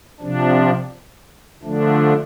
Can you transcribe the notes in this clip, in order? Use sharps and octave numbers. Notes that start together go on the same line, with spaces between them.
C3 F3 D4
D3 F3 A3 D4